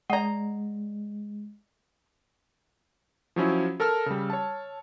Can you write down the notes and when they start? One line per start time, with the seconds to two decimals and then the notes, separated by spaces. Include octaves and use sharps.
0.10 G#3 D5 D#5 F#5 A#5
3.36 F3 F#3 C#4 E4
3.80 A4 A#4 A5 E6 F6
4.06 C#3 G3
4.30 C#5 A5